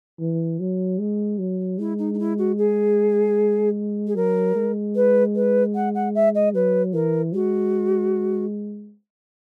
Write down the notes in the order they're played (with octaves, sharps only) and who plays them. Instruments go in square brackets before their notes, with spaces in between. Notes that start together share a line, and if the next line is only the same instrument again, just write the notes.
[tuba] E3
F#3
G#3
F#3
[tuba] G#3 [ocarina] E4
[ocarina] D#4
D#4
E4
F#4
G#4
G#4
[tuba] F#3 [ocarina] A#4
[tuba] G#3
[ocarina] B4
B4
F#5
F#5
E5
D#5
[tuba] F#3 [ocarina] B4
[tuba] E3 [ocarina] A#4
[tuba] G#3 [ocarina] F#4